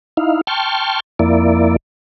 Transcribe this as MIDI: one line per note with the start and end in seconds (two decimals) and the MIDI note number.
0.17 0.41 63
0.17 0.41 64
0.17 0.41 77
0.47 1.00 79
0.47 1.00 81
0.47 1.00 84
0.47 1.00 85
0.47 1.00 89
1.19 1.76 41
1.19 1.76 58
1.19 1.76 64
1.19 1.76 74